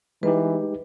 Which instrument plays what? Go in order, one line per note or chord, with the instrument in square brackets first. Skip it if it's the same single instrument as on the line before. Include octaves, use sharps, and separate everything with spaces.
[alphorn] E3 [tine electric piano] G#3 D#4 G4 [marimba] B4